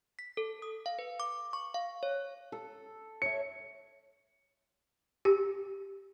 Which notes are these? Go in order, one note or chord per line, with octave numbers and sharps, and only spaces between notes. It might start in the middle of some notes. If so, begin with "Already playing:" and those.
B6
A4
D#6
F5
B4
D6
C#6
F5
C#5
A4
C#5 E5 C#7
G4